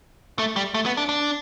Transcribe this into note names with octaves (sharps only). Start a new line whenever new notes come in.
A3
G3
A3
B3
D4
D4